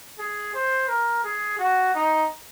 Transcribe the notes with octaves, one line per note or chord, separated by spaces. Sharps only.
G#4
C5
A#4
G#4
F#4
D#4